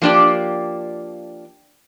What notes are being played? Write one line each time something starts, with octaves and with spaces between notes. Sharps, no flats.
F3 A#3 D4 G4 D5